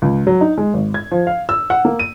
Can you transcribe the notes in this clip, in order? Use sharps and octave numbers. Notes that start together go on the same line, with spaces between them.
C#2
F#3
D#4
G#3
G#1
G#6
F3
F5
E6
F#5
A#3
D#7